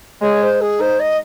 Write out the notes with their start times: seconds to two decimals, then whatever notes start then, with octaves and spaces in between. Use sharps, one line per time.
0.22 G#3 C#5
0.42 C5
0.61 G#4
0.79 D#4 C5
0.99 D#5